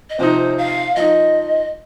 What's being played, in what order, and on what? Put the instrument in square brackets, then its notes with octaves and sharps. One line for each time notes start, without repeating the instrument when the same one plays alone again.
[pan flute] D#5
[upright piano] C3 F3 C4 D#4 [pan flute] C5
[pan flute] F5
[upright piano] F3 D#4 [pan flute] D#5